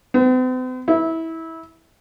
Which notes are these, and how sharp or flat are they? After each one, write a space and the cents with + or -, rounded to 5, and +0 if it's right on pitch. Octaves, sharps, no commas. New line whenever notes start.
C4 -45
E4 -20